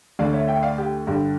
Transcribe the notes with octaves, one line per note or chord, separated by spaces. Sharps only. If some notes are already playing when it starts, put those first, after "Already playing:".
D2 D3 D5 F5
C#5 E5
E5 G5
D5 F5
G4
G2 D3 G4